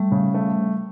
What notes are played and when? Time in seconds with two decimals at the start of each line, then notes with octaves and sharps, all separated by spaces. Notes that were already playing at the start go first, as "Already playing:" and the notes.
Already playing: G3 A3
0.11 C#3
0.34 A3